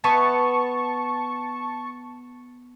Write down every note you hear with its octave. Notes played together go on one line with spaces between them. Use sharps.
B3 E5 G#5 A5 C#6